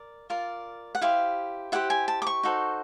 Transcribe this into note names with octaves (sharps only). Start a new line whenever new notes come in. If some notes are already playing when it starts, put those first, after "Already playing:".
Already playing: A#4 D5
F4 A#4 D5
F#5
E4 G4 C5 F5
E4 G4 C5 F#5
G#5
A5
D6
C#6
D#4 F#4 A4 C5